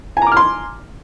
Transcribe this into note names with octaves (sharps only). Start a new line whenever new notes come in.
G#5 A#5 C6 D6 F6